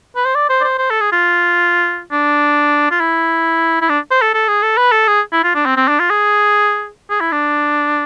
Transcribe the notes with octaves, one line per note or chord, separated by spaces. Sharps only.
B4
C5
D5
C5
D5
C5
C5
A4
G#4
F4
D4
F4
E4
E4
D4
C5
A4
A4
G#4
A4
B4
A4
G#4
E4
F4
D4
C4
C4
D4
F4
G#4
G#4
E4
D4